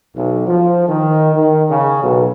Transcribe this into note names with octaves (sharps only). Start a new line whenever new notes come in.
B1
F3
D#3
D#3
C#3
B1